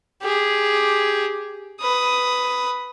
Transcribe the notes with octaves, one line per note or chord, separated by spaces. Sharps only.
G4 G#4
B4 D#6